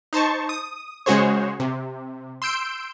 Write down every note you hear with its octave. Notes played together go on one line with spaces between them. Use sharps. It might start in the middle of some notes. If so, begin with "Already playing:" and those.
D#4 C5 A5 C#6
D#6
C#3 G#3 F#4 G#4 C5 C#5
C3
C6 E6 G6 D7